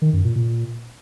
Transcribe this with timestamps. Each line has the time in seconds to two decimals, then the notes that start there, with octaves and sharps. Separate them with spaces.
0.02 D#3
0.13 F#2
0.24 A#2
0.36 A#2